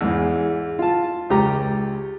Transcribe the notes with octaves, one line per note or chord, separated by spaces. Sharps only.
E2 G#2 G#3 E4
F4 A5
C#2 G4 A#5